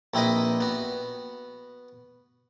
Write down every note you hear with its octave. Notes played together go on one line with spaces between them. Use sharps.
A#1 C4 E4 B4 D#5
B3 F#4